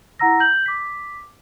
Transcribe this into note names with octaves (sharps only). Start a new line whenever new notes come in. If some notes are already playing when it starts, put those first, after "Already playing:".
E4 F#5 A#5 E6 A#6
G6 F#7
D6 B6